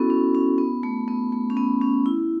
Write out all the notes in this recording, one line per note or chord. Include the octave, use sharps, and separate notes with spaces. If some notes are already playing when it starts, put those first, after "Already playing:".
Already playing: B3 C#4 E4 F#4 A4
C#4
C#4
B3
A3
B3
A3
C#4
B3
C#4
E4